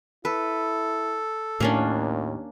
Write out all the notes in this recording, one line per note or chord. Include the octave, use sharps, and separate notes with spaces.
E4 A4 B4
D#2 A2 A#3 C#4 D4